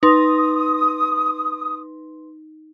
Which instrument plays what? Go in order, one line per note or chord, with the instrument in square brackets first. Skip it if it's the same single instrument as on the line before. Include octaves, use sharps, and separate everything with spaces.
[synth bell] D#4 [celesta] B4 C6 [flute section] D#6